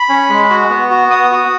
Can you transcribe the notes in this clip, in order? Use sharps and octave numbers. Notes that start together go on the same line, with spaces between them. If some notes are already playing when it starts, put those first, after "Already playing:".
Already playing: B5
C#4
G#3
F#4
B3
F#4
B3 D#6
F#4